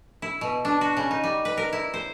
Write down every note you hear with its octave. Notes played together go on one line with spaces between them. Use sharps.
E4
B2
D4
F#4
C#3
D#4
G3
B4
A#4
E4
C5